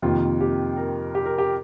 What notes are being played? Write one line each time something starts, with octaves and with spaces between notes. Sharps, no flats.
F2 C3 D#3 A#3 F4
G4
A#4
G4
A#4
G4